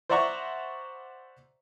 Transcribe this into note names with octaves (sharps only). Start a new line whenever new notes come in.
C5 D5 E5 F#5 A#5 C#6